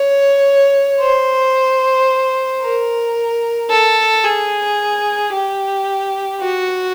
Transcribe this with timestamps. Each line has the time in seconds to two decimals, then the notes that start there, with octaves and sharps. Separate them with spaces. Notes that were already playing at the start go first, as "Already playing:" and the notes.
Already playing: C#5
1.00 C5
2.62 A#4
3.70 A4
4.24 G#4
5.33 G4
6.41 F#4